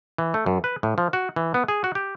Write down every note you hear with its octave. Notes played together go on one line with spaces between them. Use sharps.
E3
A3
F#2
B4
A2
F3
F#4
E3
B3
G#4
F#4
G4